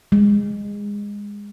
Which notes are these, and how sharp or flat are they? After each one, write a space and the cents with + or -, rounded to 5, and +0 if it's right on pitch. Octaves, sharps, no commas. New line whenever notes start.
G#3 -20